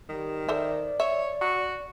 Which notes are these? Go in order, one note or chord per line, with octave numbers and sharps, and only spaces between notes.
D#3 G3
A4 C5 D5 E5
C#5 E5
F#4